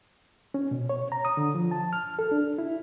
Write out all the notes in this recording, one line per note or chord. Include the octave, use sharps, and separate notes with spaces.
C#4
B2
C#5
A#5
D#6
D3
F3
A5
F6
A4
D4
E4